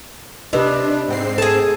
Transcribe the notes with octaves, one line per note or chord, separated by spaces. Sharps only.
C3 D4 B4 D#5
G#2 C4 C7
G#4 A4 A5